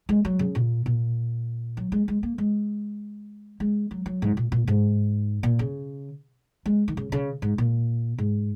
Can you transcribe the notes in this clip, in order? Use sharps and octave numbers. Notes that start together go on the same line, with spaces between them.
G#3
F#3
C#3
A#2
A#2
F#3
G#3
G#3
A#3
G#3
G#3
F#3
F#3
G#2
A#2
A#2
G#2
A#2
C#3
G#3
D#3
C#3
C#3
G#2
A#2
G#2